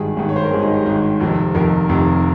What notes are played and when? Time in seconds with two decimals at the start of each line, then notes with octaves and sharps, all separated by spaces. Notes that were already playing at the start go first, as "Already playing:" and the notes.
Already playing: G#1 G2 D#3 G#4
0.16 G#1 G2 D#3
0.29 C#5
0.36 C5
0.44 A#4
0.51 G#1 G2 D#3 G#4
0.63 D#4
0.74 G4
0.86 G#1 G2 D#3
1.20 F1 F2 C3 D#3
1.55 F1 F2 C3 D#3 A#4
1.89 F1 F2 C3 D#3